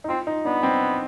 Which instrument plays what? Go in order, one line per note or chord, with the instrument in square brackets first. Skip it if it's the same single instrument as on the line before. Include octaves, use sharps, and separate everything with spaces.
[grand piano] D#4
[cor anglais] C4 [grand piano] F4
[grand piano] D#4
[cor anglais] B3 [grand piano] D4
[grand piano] C4